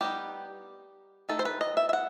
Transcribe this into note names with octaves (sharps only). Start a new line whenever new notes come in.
G3 B3 D#4 G4
D#3 A3 D#4 A4
C5
B4
D#5
E5
E5
F#5